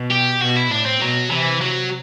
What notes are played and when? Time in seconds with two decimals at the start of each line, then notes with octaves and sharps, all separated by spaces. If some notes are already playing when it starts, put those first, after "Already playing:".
Already playing: B2
0.11 G4
0.41 B2 F#4
0.56 E4
0.71 A2 D4
0.86 C4
1.01 B2 F#3
1.31 C3 E3
1.61 F#3